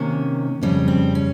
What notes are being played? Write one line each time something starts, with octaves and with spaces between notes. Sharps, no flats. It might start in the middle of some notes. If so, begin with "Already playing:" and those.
Already playing: C3 D#3 A#3 C#4
F2 C#3 G3 C#4
C4
C#4